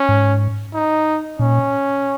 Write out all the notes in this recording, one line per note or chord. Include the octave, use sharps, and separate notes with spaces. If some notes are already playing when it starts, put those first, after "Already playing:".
Already playing: C#4
G#2
D#4
A#2 C#4